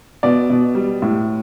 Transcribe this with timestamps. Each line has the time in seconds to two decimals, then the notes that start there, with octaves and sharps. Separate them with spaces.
0.23 B2 D5
0.50 B2
0.75 G3
1.02 A2